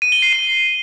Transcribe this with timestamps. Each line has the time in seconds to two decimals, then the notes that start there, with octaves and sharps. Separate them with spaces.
0.02 D#7
0.12 G7
0.22 C7
0.33 D#7